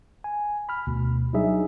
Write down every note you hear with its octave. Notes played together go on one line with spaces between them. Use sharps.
G#5
B5 F6
D2 B2
F#3 G3 D4 D#4 G#4 E5